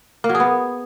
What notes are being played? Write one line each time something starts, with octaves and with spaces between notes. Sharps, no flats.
A#3
F#3
G#4
B3